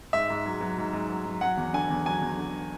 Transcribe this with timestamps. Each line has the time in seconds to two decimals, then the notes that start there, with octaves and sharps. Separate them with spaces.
0.13 G#2 E5
0.30 G#2
0.46 F#3
0.61 F#3
0.78 G#2
0.93 G#2
1.10 F#3
1.26 F#3
1.41 F#3 F#5
1.57 E2
1.73 D3 G#5
1.90 E2
2.06 F#3 G#5
2.21 E2
2.37 D3